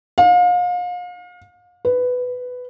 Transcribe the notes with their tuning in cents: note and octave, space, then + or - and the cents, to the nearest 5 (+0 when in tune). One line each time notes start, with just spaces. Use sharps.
F5 +35
B4 +10